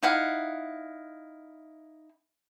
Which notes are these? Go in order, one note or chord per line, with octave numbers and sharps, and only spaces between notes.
D#4 E4 F5 F#5